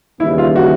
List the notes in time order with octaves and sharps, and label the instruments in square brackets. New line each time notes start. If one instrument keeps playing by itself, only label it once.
[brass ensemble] D#2 C#3 E3 G3 [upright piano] E4
[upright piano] F4
F#4